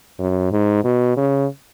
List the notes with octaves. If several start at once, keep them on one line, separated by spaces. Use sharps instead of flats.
F#2
G#2
B2
C#3